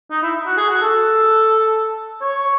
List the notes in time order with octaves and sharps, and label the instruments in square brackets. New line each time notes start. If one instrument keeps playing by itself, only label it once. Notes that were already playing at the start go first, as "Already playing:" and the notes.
[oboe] D#4
E4
F#4
G#4
F#4
A4
C#5